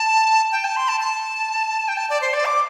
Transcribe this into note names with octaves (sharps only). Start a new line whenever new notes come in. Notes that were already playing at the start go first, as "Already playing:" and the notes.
Already playing: A5
G5
A5
C6
A5
A5
G5
A5
D5
C5
D5
D6